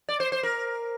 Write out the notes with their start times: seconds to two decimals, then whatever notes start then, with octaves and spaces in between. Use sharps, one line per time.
0.09 D5
0.20 C5
0.32 C5
0.43 A#4